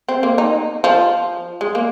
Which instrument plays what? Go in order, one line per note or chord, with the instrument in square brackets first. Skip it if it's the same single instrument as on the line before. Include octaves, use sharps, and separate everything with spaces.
[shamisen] C4
A#3
D#4
F3
G#3
A#3